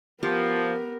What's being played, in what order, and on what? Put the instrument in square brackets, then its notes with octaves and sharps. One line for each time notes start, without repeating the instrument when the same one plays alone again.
[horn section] F3 [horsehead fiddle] B3 A#4 [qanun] G4